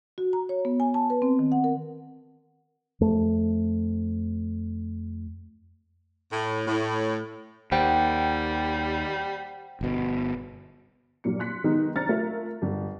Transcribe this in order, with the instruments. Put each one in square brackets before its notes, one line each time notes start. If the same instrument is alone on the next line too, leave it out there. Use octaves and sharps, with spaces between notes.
[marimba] F#4
A#5
C#5
B3
G#5
A5
B4
C4
D#3
F#5
A#4
[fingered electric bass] F2 A3
[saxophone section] A2
A2
[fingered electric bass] D#2 [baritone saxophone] G3 [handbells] C5 F#5 G5
[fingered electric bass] G1 B2
[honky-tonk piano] G2 A#2 F#3 C#7
C6 F#6 B6 C#7
D#3 G#3 B3 D#4
D4 C5 A#5 F6 A6 C#7
A3 F4 A#4 E5
G1